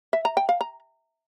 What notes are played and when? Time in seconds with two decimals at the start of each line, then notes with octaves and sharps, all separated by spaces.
0.13 E5
0.25 A#5
0.37 G5
0.49 F5
0.61 A#5